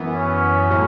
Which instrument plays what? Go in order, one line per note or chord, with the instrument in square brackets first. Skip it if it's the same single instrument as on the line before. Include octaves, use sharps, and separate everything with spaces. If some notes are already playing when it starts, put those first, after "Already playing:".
Already playing: [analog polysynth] F#2 E3 B3
[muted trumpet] C#4
[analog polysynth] A2 F#3